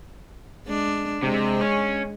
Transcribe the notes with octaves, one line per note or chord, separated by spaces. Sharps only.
G#3 D4
C3 G#3
C#4